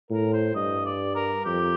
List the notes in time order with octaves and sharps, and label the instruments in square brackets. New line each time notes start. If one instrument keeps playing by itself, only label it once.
[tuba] A2 [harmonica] A#4
[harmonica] C5
[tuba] G2 [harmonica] D#5
[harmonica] D5
A#4
[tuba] F2 [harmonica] G4